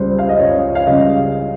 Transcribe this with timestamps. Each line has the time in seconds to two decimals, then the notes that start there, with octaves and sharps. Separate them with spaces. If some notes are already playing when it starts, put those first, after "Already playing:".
Already playing: C#2 C#3 G3 C5
0.19 F5
0.29 D#5
0.39 C#2 C#5
0.75 F5
0.86 C#3 G3 D#5